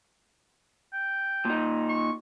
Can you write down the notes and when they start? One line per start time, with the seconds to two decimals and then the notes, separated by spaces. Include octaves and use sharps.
0.93 G5
1.45 A#2 D#4
1.89 C#6